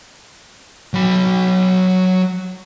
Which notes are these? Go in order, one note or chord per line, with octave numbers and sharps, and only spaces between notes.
F#3 B5